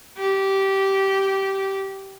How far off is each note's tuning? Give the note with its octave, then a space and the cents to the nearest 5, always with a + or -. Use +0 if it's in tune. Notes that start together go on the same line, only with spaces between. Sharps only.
G4 -15